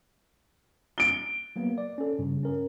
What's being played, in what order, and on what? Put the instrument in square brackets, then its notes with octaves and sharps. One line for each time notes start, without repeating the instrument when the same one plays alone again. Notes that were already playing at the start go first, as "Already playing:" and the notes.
[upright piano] D7 G7
[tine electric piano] F#3 A#3 B3
D5
C#4 A4
G2 C#3
C#4 A#4